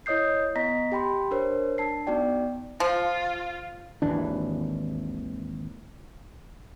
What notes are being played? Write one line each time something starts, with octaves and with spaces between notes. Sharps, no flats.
E4 C#5 D#5 D#6 G6 C7
B3 D#5 A#5 A#6 B6
G4 G5 B5 C6
D4 A#4 C5 C#5
D4 A5 C7
B3 D#4 F#4 D5 G5
F3 F4
G#1 D#2 E3 D4